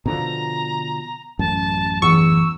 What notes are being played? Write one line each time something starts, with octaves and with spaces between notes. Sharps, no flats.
B2 D3 F3 A#5
A1 F#2 A5
E2 C#6 E6